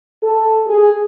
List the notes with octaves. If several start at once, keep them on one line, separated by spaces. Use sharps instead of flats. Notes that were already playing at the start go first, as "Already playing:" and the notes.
A4
G#4